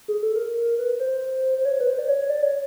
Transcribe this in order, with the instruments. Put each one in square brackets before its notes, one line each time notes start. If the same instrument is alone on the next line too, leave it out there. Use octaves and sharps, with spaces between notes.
[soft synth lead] G#4
A4
A#4
B4
C5
C5
C#5
B4
C5
D5
C#5
D5
C#5